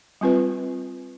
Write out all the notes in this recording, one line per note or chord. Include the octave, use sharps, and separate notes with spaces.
G3 C4 F4 B4